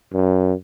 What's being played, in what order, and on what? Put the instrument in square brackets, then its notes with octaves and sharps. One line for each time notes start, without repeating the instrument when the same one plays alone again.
[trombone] F#2